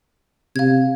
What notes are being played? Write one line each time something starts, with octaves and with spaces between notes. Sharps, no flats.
C3 F5 G#6